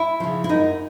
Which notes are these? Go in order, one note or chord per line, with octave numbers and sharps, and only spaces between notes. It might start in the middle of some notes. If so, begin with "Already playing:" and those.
Already playing: E4
C#3 F3
E4
F#2 D#4